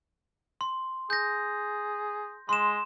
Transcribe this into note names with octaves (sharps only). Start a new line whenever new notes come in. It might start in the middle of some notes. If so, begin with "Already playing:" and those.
C6
G#4 G6 A#6
G#3 C6 E7